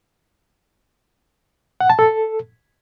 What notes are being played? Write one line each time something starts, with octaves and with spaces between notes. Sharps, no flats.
F#5
A5
A4